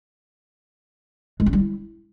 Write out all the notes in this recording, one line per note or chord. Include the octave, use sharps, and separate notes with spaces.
G#3
C#4
G3
E4